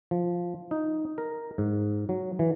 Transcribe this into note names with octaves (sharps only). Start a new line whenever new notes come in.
F3
D#4
A#4
G#2
F#3
E3